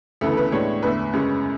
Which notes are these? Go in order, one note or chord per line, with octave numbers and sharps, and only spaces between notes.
D2 C#3 E3 B3 A4
A4
B4
A2 G#3 B3 D4 C#5
E2 D3 A3 B4
F#2 C#3 G#3 C#4